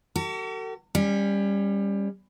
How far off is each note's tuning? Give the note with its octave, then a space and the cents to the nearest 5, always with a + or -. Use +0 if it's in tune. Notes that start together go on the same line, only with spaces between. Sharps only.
F#4 +45 A4 +45
G3 +25 C#4 +0